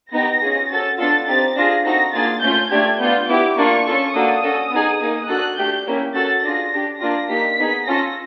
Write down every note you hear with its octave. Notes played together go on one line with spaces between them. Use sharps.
B3 D#4 G4 A#6
C#4 F4 G#4
C#4 F#4 A4 A6
B3 D4 F4 A4 A6
C4 D#4 G4 A6
D4 F4 G#4 A#6
C4 D#4 F#4 A4 A#6
A#3 D4 F4 G#4 A6
A3 C#4 F4 G6
A3 D4 G4 G#6
B3 D4 F4 G6
B3 E4 G4 D6
A#3 D4 F4 C#6
C#4 F4 A4
A#3 D4 F#4 A4 D#6
C#4 F#4 A4
B3 D#4 G#4
A#3 D#4 G#4
D4 F#4 A4 F#6
A3 D4 G4 G6
A#3 C#4 E4 G4
C#4 F#4 A4 A6
D4 F4 G#4 A#6
D4 G4
A#3 D4 F4 A#6
A#3 D#4 G4 B6
B3 D#4 G#4
C#4 F4 A4 A#6